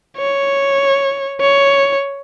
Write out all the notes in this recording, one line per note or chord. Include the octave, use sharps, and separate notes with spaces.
C#5
C#5